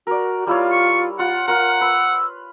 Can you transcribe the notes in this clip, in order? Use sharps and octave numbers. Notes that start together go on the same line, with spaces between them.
F#4 A#4 D5
G3 E4 F4 C#5
C#6
F4 F#5
F4 A#4 F#5 F6
B4 E6